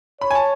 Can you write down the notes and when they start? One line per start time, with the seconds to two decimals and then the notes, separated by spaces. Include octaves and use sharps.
0.21 C#5 B5
0.31 G#5
0.35 A5